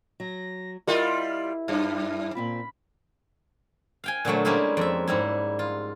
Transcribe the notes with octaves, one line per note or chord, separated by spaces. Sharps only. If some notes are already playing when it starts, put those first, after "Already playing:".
F#3 A#6
G3 E4 F4 G4 A#4 D#5
F#2
A#2 C4 F4 B5
F5 G5 G#5
A#2 D3 F#3 A3
G3 G#3 A#3 C#4 E4 G4
F2 E5
G#2 G3 E4
F4